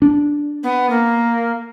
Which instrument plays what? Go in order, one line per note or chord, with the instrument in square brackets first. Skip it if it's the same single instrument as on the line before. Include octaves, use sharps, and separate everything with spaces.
[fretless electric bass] D4
[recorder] B3
A#3